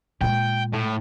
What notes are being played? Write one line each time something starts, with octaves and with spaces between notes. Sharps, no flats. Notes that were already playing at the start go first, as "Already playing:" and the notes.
A#2 G#3 G5
A2